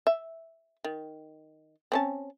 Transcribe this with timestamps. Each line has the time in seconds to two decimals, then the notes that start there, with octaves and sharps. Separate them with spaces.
0.07 E5
0.85 D#3
1.92 C4 C#4 A5